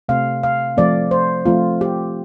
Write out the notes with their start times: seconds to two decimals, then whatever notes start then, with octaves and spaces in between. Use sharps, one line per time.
0.09 C3 A3 C4 F5
0.43 F5
0.77 F3 A3 C4 D5
1.11 C5
1.46 F3 A3 C4 F4
1.81 G4